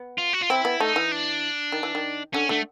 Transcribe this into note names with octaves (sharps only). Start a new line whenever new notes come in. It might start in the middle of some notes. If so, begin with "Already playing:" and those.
Already playing: B3
F4
F#4
F4
C4 E4
B3
A3 D#4
E3
D4
D#3
E3
D#3
D3 C#4
D3 A3